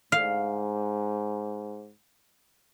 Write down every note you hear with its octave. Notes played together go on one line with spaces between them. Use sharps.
G#2 F5